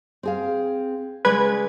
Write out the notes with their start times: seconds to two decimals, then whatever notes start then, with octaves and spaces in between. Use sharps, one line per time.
0.23 C4 G#4 F5
1.25 C#3 G#3 B4 D5 G#6